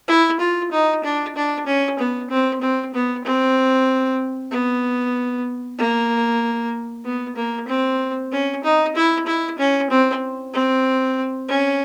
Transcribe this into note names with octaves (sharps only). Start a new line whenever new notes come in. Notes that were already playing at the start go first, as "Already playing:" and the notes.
E4
F4
D#4
D4
D4
C#4
B3
C4
C4
B3
C4
B3
A#3
B3
A#3
C4
C#4
D#4
E4
E4
C#4
C4
C4
C#4